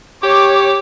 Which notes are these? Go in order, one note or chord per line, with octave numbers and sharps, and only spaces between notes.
G4 C#5 D6